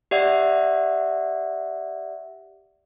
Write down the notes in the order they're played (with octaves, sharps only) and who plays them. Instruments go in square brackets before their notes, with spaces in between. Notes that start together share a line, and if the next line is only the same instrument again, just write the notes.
[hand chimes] G4 D5 E5 F#5